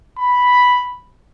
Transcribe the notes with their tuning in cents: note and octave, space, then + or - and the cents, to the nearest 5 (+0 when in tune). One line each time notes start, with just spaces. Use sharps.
B5 +0